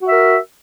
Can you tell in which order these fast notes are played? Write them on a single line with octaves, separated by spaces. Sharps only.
F#4 E5 A#4